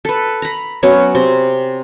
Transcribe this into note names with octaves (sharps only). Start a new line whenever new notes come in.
A4 B4
A#5 B5
F#3 B3 C#4
C3 C4